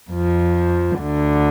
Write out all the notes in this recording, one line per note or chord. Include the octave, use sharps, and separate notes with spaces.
F2 F3
D2 D3